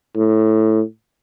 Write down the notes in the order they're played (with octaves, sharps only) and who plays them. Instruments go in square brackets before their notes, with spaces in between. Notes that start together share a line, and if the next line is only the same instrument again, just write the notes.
[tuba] A2